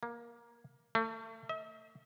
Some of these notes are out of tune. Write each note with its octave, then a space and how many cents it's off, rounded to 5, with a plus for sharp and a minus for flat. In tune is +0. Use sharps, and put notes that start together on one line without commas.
A#3 +20
A3 +35
E5 -45